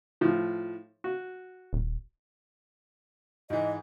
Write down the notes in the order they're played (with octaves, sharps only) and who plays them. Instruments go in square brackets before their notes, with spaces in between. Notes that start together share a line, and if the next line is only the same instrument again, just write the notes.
[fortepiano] A2 F3
F#4
[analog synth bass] D#1
[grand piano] G#2 E3 [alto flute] D#5